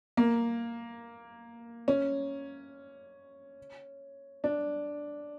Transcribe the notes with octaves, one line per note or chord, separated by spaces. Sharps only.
A#3
C#4
D4